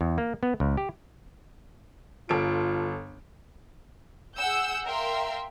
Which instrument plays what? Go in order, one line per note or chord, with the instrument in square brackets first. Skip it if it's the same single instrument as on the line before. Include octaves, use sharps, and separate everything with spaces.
[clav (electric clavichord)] E2
A#3
B3
C#2
G4
[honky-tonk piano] G1 A4 D7 [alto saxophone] F4
[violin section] G#4 F#5 E6 G6
A#4 E5 F5 G5 C6